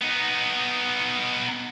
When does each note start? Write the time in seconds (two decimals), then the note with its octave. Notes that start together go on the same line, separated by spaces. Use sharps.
0.02 B3 D#4